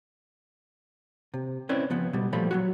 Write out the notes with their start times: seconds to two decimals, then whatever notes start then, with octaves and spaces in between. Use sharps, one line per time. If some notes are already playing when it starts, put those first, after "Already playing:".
1.34 C3
1.69 C4 C#4 E4 B4 C5 D5
1.90 C#3 F3 B3
2.13 B2 G3
2.33 A#2 F3 G3 A3 B5
2.51 F#3 G#3 F#4